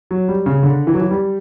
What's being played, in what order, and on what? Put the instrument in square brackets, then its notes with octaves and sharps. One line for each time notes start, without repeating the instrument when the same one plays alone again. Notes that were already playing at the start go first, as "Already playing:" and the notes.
[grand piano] F#3
G3
C#3
D3
E3
F#3
E3
G3